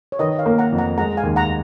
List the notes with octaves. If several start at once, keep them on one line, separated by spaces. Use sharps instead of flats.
C#5
D#3 B4 D#5
C#5 F5
A#3
F#5 A#5
F2
F#5 A#5
G#3 F#5 A#5
F5 G#5
D#2
F#5 A#5